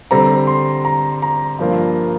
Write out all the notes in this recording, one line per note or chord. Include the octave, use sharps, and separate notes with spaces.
D3 G3 C4 A#5
C6
A#5
A#5
G2 F3 A#3 F4